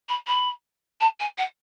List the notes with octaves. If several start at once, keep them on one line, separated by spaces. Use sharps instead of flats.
B5
B5
A5
G#5
F#5